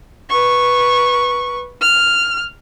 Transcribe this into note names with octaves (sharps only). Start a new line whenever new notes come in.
B4 C#6
F6